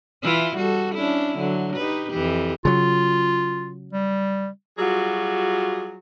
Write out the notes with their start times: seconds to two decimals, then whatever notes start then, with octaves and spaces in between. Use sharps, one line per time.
0.23 E3 E4 F4
0.56 G3 F#4 A4
0.95 C#4 D4 E4
1.37 D3 F#3
1.76 D#4 G4 B4
2.11 F2 E3 G4
2.65 C#3 F#3 F4
3.93 G3
4.78 F#3 G3 F4 F#4 G#4